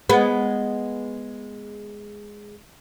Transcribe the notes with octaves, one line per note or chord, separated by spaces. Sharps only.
G#3 B3